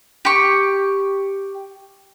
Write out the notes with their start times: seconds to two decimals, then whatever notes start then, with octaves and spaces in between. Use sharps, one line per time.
0.25 G4 C#6